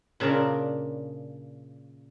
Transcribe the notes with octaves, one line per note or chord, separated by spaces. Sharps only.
A#2 C#3 D4 A#4 D5